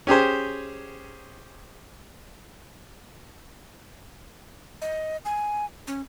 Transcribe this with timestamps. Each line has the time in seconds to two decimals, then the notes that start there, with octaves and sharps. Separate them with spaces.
0.07 C#4 G4 G#4 C5
4.82 D#5
5.25 G#5
5.87 C#4